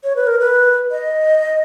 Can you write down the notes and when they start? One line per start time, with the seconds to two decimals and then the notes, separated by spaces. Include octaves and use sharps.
0.04 C#5
0.16 B4
0.27 A#4
0.40 B4
0.91 D#5